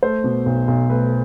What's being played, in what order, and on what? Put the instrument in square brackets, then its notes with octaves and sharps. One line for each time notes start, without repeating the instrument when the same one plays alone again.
[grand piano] A3 C5
B2
B1
B1
A3 B4